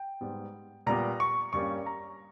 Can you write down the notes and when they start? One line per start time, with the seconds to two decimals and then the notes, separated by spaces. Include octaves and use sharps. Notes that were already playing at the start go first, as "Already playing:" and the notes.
Already playing: G5
0.21 G#2 G3 B3
0.86 A#2 G3 B3 A#5
1.20 C#6
1.53 G2 G3 A#3 C#4 C#6
1.86 A#5